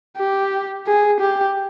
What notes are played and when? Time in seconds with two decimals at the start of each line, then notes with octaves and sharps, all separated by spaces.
0.18 G4
0.87 G#4
1.20 G4